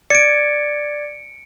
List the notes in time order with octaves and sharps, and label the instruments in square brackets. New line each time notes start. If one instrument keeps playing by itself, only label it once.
[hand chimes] D5 G#6 A6 [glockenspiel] C#7 D7